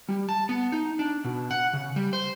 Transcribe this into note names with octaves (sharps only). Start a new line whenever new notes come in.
G3
A5
B3
D#4
D4
B2
F#5
C#3
G3
C5